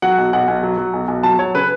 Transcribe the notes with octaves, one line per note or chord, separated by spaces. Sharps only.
F#3 F#5
B1
B1 F#5
B1
F#3
F#3
B1
B1
F#3 A5
F#3 C#5
C#3 B4